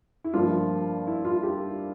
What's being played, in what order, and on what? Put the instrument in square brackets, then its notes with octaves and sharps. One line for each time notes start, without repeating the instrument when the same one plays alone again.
[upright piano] E4
G2 F3 A#3 F4
E4
F4
G4